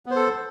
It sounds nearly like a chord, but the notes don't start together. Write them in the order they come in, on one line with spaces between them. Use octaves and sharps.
B3 C5 A4